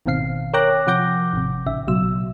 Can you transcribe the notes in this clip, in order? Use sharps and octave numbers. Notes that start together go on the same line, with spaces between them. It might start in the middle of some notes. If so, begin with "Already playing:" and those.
G#1 B2 D#3 C4 F5 C7
A#4 C#5 G5 D6 F#6 A#6
C3 F3 F#5 D6 G6 A#6
G#1 C3
A1 C#3 E5
A1 B2 F#3 E6